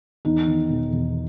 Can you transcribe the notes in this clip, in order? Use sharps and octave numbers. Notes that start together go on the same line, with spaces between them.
E2 D#4
D#3
E1
E1